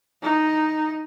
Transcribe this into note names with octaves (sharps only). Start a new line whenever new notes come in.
D#4